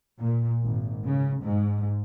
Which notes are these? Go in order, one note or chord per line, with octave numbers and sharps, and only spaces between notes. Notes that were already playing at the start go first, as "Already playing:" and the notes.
A#2
G#1
C#3
G#2